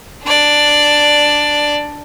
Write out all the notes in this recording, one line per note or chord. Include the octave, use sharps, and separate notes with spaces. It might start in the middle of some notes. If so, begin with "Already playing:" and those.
D4 D5